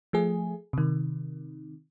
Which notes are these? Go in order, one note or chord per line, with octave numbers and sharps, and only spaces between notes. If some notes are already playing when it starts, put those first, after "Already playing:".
F3 A3 G#4
C3 D#3